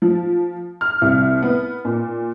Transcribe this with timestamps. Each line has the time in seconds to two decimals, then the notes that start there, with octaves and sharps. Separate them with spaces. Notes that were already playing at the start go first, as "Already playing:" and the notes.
0.02 F3
0.81 F6
1.01 C2
1.42 B3
1.85 A#2